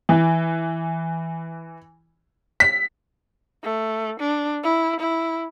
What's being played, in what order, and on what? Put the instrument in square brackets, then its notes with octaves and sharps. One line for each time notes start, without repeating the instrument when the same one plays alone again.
[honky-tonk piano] E3
B6
[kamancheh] A3
D4
E4
E4